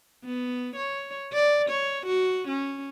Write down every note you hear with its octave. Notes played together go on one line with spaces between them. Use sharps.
B3
C#5
D5
C#5
F#4
C#4